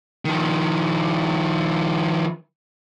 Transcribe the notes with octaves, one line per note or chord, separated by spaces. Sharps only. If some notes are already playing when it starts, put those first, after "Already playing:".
D#3 F3